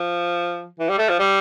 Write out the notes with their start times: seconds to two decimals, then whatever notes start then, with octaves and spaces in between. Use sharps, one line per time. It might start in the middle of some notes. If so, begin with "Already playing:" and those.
Already playing: F3
0.80 E3
0.89 G3
0.98 A3
1.09 F3
1.19 G3